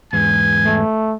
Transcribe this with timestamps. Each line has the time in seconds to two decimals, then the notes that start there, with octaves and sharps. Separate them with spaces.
0.13 E2 G#2 G#5
0.65 A3